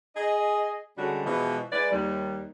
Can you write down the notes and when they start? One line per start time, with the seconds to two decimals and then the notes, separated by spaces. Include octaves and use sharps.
0.16 G#4 D#5
0.98 D3 G3 G#3 C#4 F#4
1.25 B2 E3 F3 G#3
1.72 G#3 E4 B4 D5
1.91 D#2 G3